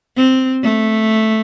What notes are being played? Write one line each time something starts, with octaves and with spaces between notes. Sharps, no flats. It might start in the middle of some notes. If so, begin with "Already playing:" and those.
C4
A3